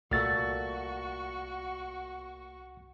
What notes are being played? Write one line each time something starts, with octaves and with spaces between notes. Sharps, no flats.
C2 A#2 A3 F#4 F#5 C#6 A6